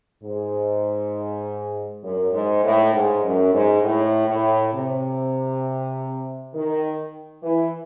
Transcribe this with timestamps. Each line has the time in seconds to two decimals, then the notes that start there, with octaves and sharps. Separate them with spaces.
0.23 G#2
2.03 F#2
2.33 G#2
2.63 A2
2.93 G#2
3.23 F#2
3.53 G#2
3.83 A2
4.28 A2
4.73 C3
6.53 D#3
7.43 E3